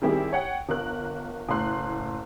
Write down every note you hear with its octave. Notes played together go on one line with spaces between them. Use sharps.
D#3 G3 C4 E4 G4 G#4
C#5 F#5 G5
G1 A#4 F#6
F#1 A2 A3 C6 F#6